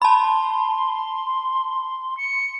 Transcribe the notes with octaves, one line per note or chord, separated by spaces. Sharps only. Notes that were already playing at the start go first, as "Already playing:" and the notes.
A5 B5 C6
C#7